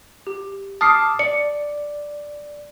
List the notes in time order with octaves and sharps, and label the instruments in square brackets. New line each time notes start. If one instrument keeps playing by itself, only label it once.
[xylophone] G4
[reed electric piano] A5 D6 [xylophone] D#6 F6 C7
[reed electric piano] D5 [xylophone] C#7